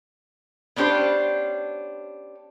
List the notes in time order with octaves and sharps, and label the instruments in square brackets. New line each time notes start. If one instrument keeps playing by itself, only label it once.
[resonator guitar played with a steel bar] B3 C#4 D4 G4 C5